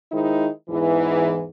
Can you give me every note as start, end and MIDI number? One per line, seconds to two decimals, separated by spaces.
0.12 0.47 51
0.12 0.47 56
0.12 0.47 63
0.12 0.47 64
0.12 0.47 72
0.69 1.44 40
0.69 1.44 44
0.69 1.44 52